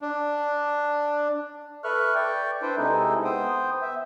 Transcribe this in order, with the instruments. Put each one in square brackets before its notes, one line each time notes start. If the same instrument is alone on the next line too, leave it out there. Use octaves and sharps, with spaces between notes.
[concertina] D4
[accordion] A4 B4 E5 C#6 F6 F#6
D5 G5 C#6
D4 E4 B4 C5 G5
C3 G#3 C4 D#4 E4 A4
B3 C5 G5 D#6
E5